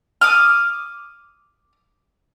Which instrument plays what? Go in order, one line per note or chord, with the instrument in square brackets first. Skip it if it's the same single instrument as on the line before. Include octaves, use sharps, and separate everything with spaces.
[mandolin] D6 D#6 F6